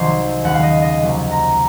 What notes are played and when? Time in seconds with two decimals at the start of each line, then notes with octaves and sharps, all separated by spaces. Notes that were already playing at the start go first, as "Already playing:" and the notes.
Already playing: C2 C3 D#3 F#3 C5
0.43 D#2 C#3 G#3 F#5
0.53 F5
0.63 D#5
0.82 D#5
1.02 C2 C3 F#3 A#3
1.31 A#5